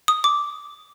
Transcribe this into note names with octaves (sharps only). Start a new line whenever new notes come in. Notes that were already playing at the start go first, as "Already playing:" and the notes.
D#6
D6